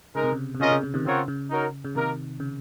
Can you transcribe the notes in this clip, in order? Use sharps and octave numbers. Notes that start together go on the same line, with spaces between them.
C#3 G#3 D#4 A#4
C3
C#3
C3
C#3 C#4 F4 A#4 D#5
C#3
C#3
C3 D#3
C#3 C4 F4 A#4 C#5 F#5
C#3
D#4 F#4 A#4 C#5
C#3
C3 D#3 A#3 D#4 A#4
C#3